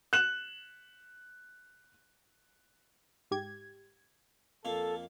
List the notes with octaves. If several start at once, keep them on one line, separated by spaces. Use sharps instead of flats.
F#6 E7 F#7
G#2 G4 G#6
F2 A#3 A4 F5